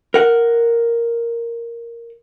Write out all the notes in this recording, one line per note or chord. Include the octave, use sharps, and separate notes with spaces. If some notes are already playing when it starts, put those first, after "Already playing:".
A#4 F#5